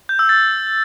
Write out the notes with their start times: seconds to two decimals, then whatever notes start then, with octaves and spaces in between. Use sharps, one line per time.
0.09 G6
0.19 E6
0.29 A6